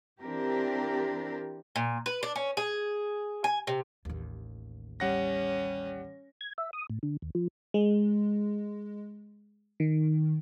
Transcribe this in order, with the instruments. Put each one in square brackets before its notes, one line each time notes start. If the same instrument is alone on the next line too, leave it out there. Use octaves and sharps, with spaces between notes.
[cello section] E3 C4 D4 G4 A#4
[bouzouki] A#2
B4
D4
C#4
G#4
G#5
C3
[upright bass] A1 D#2
[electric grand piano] G3 F#5 A#6 [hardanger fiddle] C#4
[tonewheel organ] G#6
E5
D#6
A2
D3
D#2
F3
[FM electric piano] G#3
D#3